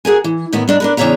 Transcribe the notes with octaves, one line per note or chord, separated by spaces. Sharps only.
F#4 G#4 A#4 G#5
E3
A2 D#3 E3 B3 E4
G2 D4 D#4
D4 A#4 B4
E2 C#3 D4 C#5 E5 A#5